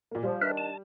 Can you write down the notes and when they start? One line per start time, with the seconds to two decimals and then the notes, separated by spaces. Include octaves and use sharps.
0.11 A#2 A#3
0.23 F3 G3
0.42 D#3 D4 A#4 B4 E5
0.57 A5